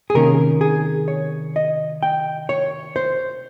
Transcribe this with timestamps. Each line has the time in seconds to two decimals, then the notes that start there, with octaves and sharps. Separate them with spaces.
0.10 G#4
0.14 C3 D#3 A#3 C#4 A#4
0.61 G#4
1.08 C#5
1.56 D#5
2.03 G5
2.49 C#5
2.96 C5